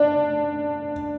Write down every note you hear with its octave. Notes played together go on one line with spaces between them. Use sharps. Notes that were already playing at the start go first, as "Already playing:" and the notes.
Already playing: D4